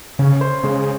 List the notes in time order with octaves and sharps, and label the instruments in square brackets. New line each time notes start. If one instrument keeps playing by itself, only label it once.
[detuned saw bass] C#3 [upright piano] C#4
[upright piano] C5
[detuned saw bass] C#3 [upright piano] G#3